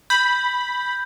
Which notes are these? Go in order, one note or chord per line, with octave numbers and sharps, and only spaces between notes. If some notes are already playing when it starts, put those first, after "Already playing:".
B5 G6